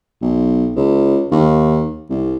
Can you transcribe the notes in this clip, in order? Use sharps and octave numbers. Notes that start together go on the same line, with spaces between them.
B1
C#2
D#2
C2